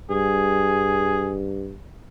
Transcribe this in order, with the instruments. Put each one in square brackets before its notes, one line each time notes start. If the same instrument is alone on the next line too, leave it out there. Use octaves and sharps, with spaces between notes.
[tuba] G2 [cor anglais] G#4